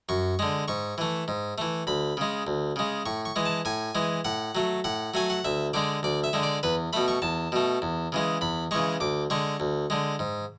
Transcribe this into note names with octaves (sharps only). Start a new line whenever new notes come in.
F#2 C#6
D3 G#3
G#2 C#6
E3 A3
G#2
E3 A3
D2 B5
C#3 G#3
D2
C#3 G#3
A2 C#6
C#6
E3 G#3
A5
A2 G#5
E3 G#3
A2 F#5
F#3 A3
A2 F#5
F#3 A3 G#5
F#5
D2 E5
D3 G#3 D5
D2 D5
E5
D3 G#3
D5
E2 B4
B2 A3 B5
C#6
E2 A5
B2 A3
E2
C#3 E3 G#3
E2 B5
C#3 E3 G#3 C#6
D2 D6
D3 G#3 C#6
D2
D3 G#3
G#2